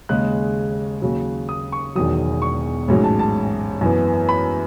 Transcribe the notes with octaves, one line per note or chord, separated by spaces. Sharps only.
D#2 C#3 G#3 F#6
D#2 C#3 F#3
D#6
C#6
E1 E2 D#3 F#3 D#6
C#6
A1 G#2 F#3 C#4
A5
A5
F#2 E3 B3
B5